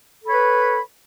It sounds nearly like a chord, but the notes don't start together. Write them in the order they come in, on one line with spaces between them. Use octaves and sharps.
A4 B5 C#5 B4